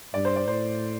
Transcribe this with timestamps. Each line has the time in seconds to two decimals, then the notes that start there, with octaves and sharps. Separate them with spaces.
0.14 G2 D5
0.25 C5
0.36 D5
0.48 A2 C5